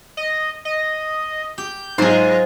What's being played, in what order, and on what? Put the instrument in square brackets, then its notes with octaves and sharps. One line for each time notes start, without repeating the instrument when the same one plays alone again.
[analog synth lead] D#5
D#5
[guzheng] G4 [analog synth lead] G6
[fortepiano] G#2 [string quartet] F#3 G#3 F4 [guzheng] G#4 C5